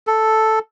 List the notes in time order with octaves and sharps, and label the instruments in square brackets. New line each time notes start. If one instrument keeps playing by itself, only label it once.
[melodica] A4